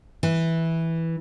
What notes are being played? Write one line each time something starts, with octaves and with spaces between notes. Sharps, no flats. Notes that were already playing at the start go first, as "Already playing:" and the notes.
E3